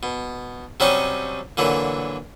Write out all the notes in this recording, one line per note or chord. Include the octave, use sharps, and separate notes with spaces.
B2
C3 F#3 G3 C#4 D#4 C#6
A#2 D3 E3 F#3